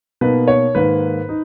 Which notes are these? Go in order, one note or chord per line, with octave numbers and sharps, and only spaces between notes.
B2 A#3 D#4 B4
C#5
G#2 D#3 A#3 B4
D#4